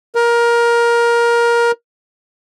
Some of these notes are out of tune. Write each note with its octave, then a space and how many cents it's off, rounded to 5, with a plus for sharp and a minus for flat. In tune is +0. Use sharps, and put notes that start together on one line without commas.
A#4 +20